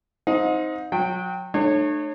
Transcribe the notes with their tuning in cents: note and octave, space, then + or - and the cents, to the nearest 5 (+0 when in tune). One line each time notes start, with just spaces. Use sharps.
C4 +0 D#4 +15 F#5 -45
F#3 -30 G5 +0
A3 +0 D4 +45 C#5 -15